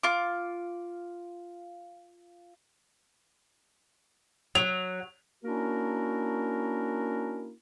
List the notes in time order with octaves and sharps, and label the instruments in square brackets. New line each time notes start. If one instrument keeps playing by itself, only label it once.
[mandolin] F4 D6
[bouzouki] F#3 [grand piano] F7
[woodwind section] A#3 C#4 D4 E4 F#4 A#4